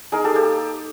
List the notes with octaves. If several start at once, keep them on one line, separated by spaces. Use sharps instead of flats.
D#4 G#4 A#4
G4 A4
A#3 G4 A4